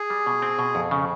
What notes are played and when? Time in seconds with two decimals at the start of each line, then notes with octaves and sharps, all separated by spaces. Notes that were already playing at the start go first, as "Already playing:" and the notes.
Already playing: G#4
0.10 G3
0.26 B2
0.42 C4
0.59 B2
0.75 F2
0.91 C#3